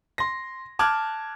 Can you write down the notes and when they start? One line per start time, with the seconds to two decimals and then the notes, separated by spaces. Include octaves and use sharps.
0.18 C6 A#6
0.79 A5 D6 F6 F#6 G#6